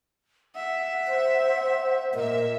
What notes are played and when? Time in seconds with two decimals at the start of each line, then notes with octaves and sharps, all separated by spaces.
0.55 E5 F#5
1.07 C5
2.14 A#2 A#4 D#5 E5